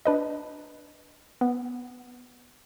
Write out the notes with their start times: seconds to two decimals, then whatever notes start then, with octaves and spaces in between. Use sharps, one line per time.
0.05 D4 B4 D#5
1.41 B3